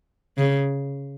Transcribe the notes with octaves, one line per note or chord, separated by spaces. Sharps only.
C#3